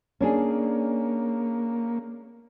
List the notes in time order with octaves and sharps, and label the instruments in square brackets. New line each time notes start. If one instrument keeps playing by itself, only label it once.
[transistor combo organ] A#3 [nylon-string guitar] C#4 D4 G#4